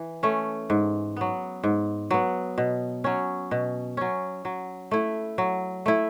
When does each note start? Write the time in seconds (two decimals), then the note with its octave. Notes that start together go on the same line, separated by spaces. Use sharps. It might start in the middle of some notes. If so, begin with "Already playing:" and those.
Already playing: E3
0.23 A3 C#4
0.70 G#2
1.16 F#3 B3
1.64 G#2
2.11 F#3 B3
2.58 B2
3.04 F#3 C#4
3.51 B2
3.97 F#3 C#4
4.45 F#3
4.91 A3 E4
5.38 F#3
5.86 A3 E4